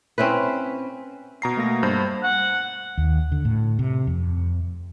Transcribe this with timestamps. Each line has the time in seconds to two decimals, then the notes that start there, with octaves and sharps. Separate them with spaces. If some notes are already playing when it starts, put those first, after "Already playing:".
0.18 C4 C#4 E4 B4
1.42 B2 A#5 C7
1.57 A3 A#3 A#6
1.83 G2 C5 G6
2.24 F#5
2.98 D#2
3.32 D3
3.45 A2
3.79 C3
4.07 F2